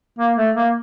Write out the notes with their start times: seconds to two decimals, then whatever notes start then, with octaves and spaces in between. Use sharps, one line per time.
0.19 A#3
0.37 A3
0.56 A#3